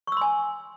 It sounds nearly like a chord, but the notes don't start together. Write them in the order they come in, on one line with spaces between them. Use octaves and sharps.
C#6 E6 C6 G#5